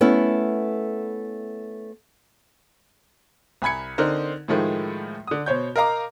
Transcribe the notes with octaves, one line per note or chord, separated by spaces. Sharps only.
A3 B3 C#4 E4
C2 G#5 B5 G#6 C#7
D3 C4 D#4 A#4 C5
A2 D#3 F3 G#3 A3
D3 D#6
B2 C5 C#5 G6
A#4 D#5 F5 A#5 D6